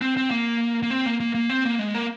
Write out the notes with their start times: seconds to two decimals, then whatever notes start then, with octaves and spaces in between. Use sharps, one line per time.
0.01 C4
0.17 C4
0.31 A#3
0.83 A#3
0.90 C4
1.06 A#3
1.20 A#3
1.35 A#3
1.49 C4
1.65 A#3
1.79 G#3
1.95 A#3